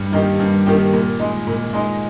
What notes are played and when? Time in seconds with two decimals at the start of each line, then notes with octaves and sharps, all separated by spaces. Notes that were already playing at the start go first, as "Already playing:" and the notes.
Already playing: G2
0.12 D#3 A#3 D#4 G4
0.39 G2
0.66 D#3 A#3 D#4 G4
0.93 A#2
1.19 G#3 D#4
1.47 A#2
1.73 G#3 D#4